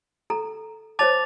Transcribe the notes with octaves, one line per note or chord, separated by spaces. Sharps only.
A4 A#5
C5 C#5 A5 D6 A6 F7